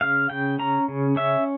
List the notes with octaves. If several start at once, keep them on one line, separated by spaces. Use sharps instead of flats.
C#3 F5
C#3 G5
C#4 A#5
C#3
C#4 E5